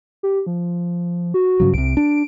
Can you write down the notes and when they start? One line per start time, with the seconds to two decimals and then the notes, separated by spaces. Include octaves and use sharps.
0.23 G4
0.47 F3
1.34 F#4
1.60 G2 C#3 F#3
1.74 C2 C3 D7
1.97 D4